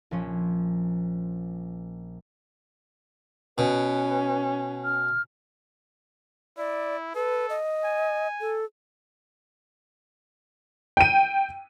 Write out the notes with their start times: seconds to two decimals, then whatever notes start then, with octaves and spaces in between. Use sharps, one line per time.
0.11 A#1 F3 C#4
3.58 B2 C#4 B4
4.84 F6
6.58 E4 D5
7.15 A4 B4
7.49 D#5
7.84 G#5
8.41 A4
10.97 G5 D#7